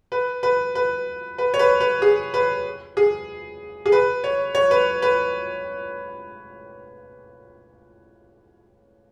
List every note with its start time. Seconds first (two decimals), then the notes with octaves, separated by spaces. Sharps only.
0.12 B4
0.43 B4
0.75 B4
1.38 B4
1.54 C#5
1.59 B4
1.80 B4
2.02 G#4
2.34 B4
2.97 G#4
3.86 G#4
3.92 B4
4.24 C#5
4.55 C#5
4.71 B4
5.02 B4